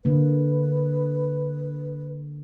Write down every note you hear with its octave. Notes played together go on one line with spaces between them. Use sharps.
D3 A#3 B4